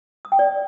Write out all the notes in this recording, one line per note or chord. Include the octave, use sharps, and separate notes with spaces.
D#6
G5
D5